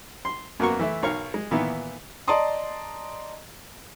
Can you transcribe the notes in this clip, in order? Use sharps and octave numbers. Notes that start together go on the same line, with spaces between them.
C6
F#2 A#3 B3 F#4 A#4 C#6
E3 A3 E4
B1 A#4 C#5 F5 C#6
G#3
A#2 D#3 E3 B3 E4
D5 D#5 A5 A#5 C6 D#6